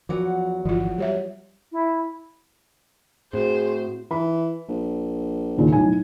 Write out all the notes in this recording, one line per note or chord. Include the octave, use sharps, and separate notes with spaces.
E2 F3 F#3 F#5 D6
G1 E3 F3 F4
G3 G4 C#5 E5
E4
A2 C4 F#4 G#4 C5
E3 B5
A#1
D#2 A#2 C#3
B1 A2 G#5